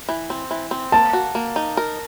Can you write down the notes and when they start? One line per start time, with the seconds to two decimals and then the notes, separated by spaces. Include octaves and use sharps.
0.09 E3
0.30 C4
0.51 E3
0.71 C4
0.92 A#3 A5
1.13 F#4
1.35 A#3
1.56 D#4
1.77 A#4